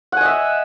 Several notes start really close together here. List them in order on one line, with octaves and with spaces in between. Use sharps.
F#5 G#5 D#5 E5